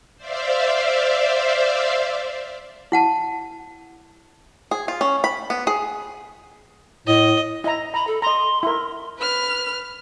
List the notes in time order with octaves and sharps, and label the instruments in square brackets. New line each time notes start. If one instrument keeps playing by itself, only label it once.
[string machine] C5 D5 E5 F5
[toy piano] E4 F#5 A5
[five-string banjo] G#4
F4
C#4
B5
B3
G#4
[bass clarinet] A2 [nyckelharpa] D#5
[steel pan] E4 A#5 [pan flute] D#5
[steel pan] A#5 [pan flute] B5
[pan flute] A4
[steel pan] D#5 A#5 [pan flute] C6
[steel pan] E4 A#4
[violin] B4 F6